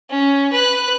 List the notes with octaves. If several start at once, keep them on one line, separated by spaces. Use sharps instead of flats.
C#4
B4 F#6